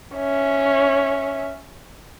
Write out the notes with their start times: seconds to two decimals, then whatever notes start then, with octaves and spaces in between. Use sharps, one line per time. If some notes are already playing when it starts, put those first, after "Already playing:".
0.15 C#4 E5